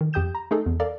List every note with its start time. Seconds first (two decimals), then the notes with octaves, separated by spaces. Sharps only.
0.01 D#3
0.13 F2 G4 G5 D#6 G6 E7
0.35 A#5
0.51 A3 D#4 G#4 A4
0.66 E2
0.80 A4 A#4 D5 F5